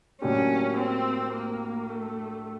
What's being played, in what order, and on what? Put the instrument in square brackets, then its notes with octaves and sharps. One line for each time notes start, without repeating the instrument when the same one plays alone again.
[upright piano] A2 F#3 A#3 D4 G4 [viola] C#4
[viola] C4
A#3
A3